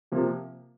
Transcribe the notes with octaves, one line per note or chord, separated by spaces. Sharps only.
C3 F3 A#3 G4